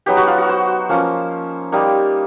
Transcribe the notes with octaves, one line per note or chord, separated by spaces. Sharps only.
F#3 B3 D#4 G4
F#4
F4
F#4
C5
F3 A#3 C#4 F4
G3 A#3 D#4